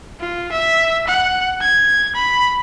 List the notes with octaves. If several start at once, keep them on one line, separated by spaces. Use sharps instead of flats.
F4
E5
F#5
G#6
B5